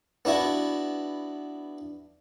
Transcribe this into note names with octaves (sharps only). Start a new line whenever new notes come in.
B3 D4 E4 F#4